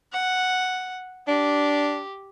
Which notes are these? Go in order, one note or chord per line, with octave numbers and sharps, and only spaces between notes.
F#5
D4 G4